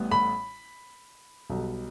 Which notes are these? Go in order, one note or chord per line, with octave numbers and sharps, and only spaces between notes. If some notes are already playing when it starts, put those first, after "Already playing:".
Already playing: A1 A2 G3 B3
B5
B1 B2 G3